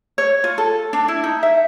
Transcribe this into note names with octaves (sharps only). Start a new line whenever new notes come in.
C#5
F4
A4
D4
E4
D#4
E5